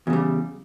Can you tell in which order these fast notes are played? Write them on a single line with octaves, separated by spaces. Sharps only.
E2 C#3 G3